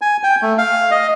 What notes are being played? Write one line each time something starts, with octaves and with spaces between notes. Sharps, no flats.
G#5
G5
A3
F5
D#5